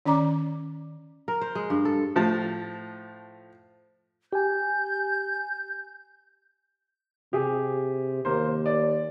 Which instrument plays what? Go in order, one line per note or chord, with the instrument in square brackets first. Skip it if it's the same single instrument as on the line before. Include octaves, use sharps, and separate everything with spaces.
[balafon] D#3 C#4 D5 A#5 D6
[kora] A#4
C5
G#3
G2
A4
[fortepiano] A2 F3 A5
[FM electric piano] G4 G#5 [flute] G6
[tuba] C3 [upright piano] G4 G#4
[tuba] D#2 [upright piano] A#3 C5
[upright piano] D5